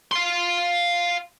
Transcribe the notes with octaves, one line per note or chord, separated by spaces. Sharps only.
F5 C6